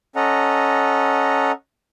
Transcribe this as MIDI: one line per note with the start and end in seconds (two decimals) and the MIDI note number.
0.16 1.52 61
0.16 1.52 69
0.16 1.52 75
0.16 1.52 78
0.16 1.52 82